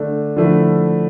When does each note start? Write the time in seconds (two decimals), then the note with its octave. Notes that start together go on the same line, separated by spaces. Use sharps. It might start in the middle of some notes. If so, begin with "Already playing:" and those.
Already playing: D3 A3 D4
0.36 D3 F3 A3 E4